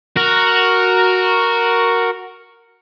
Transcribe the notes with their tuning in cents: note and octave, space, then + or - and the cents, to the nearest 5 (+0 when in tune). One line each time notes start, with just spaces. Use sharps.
F#4 +0 A#4 +0